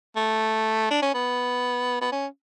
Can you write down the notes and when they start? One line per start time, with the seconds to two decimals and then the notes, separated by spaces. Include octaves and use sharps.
0.16 A3
0.91 D4
1.02 C#4
1.14 B3
2.01 B3
2.12 C#4